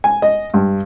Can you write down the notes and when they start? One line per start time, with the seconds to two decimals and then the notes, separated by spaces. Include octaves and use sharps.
0.04 G#5
0.22 D#5
0.54 G2